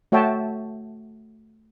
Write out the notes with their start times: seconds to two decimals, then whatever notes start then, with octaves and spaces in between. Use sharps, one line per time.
0.12 A3 F#4 C#5 E5 G5 A5